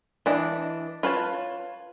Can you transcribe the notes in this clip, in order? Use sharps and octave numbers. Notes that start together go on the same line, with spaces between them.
E3 D4 D#5
F4 B4 C#5 A5